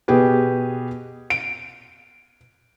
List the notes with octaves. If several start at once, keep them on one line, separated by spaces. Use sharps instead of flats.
B2 G4 G#4 B4
D7